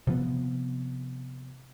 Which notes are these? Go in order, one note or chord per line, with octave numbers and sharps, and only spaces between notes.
C3 F3 B3